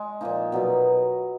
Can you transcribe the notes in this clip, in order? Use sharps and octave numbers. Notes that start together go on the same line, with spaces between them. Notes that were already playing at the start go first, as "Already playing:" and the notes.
Already playing: G#3
A#2 F3 A#3 D#4
B2 F#3 B3